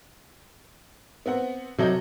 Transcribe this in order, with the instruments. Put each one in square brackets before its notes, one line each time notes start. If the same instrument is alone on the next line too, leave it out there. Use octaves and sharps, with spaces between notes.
[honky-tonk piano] B3 C4 F#5
[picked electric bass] C3 F#3 [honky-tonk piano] A4 D#5 G6